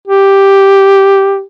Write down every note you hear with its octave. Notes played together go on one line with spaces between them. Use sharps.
G4